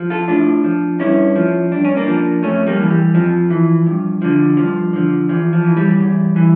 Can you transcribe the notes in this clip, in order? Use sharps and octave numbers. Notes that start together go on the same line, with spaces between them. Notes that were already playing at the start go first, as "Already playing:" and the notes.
Already playing: F3
F4 A4
A2 D4 F4
F3
G2 C#4 E4
F3
G2 D4
C#4
A#3 D4
F3
F2 A3 C#4
G3 A#3
E3
G3
F2 F3
E3
G2
D3 F3
G2 F3
D3 F3
E2 F3
F3
E3
G3
E2
E3